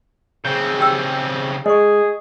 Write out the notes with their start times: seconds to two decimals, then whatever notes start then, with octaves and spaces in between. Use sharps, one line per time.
0.45 C#3 C4 G6
0.79 G4 G5 E6
1.66 G#3 G#4 D#5 C#6